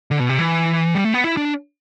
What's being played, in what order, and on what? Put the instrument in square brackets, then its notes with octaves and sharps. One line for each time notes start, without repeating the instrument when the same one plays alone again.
[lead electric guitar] D3
B2
C3
E3
G3
A3
B3
E4
D4